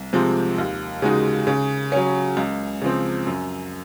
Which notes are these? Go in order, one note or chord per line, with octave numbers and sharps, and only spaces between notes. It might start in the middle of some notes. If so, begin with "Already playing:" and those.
Already playing: C2
C3 F3 G#3 C4
D#2
C#3 G#3 D#4 F#4
C#3
F#3 C#4
C#2
C#3 F3 C4
F#2